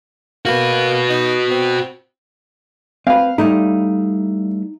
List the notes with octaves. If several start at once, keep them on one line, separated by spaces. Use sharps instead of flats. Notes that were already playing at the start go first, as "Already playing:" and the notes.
A#3 F#4 B4
D#4
C4
C4 B4 F5
G3 A3 D#4 E4